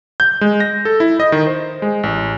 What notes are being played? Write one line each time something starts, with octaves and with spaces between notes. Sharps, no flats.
G6
G#3
A#6
A4
E4
D#5
D#3
C5
G#3
A1